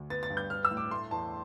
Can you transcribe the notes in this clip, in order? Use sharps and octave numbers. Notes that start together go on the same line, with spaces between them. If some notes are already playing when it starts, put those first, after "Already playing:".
Already playing: D2
B3 A6
A6
G2
G6
B3 F6
E6
A2
D6
A3 C6
E2 A5